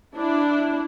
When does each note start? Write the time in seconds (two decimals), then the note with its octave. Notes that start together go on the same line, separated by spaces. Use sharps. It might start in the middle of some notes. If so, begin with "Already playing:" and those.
0.16 D4 E4